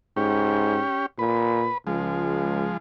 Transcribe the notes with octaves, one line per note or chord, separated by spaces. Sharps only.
G#2 C#4 G4
A#2 B4
C#2 F3 G#3